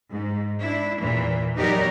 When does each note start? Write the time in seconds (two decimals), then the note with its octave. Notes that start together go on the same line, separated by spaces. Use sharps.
0.11 G#2
0.61 D4 E4
0.99 E2 A#2 E3
1.55 E2 F#3 D#4 G4 A#4 D5